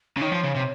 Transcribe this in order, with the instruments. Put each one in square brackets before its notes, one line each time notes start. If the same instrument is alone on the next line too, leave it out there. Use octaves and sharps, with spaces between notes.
[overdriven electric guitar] C#3
[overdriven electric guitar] D#3 [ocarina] C#5
[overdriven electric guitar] F3
C#3
C3